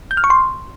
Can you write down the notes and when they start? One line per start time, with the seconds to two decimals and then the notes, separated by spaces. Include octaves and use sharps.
0.11 G6
0.17 F6
0.24 C#6
0.30 C6